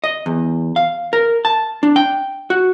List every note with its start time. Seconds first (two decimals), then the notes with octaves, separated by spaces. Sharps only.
0.04 D#5
0.26 E2
0.76 F5
1.13 A#4
1.45 A5
1.83 D4
1.96 G5
2.50 F#4